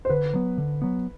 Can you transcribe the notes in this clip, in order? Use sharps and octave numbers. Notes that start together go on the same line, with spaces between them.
C5
D3 B4
F#3 B3
D3
F#3 B3